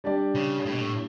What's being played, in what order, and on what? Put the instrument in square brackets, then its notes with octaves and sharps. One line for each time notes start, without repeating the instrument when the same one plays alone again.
[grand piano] G3 D4 G4 D5
[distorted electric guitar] C#3
A2
B2
A2